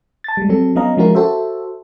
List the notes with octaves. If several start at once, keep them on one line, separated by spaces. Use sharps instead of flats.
A5 A6
G3 G#3
F#3 C4 A4
F#3 B3 C#4 D#5 F5 A#5
F3 G#3 C#4 E4 F#4 A#4
F#4 A4 C5 E5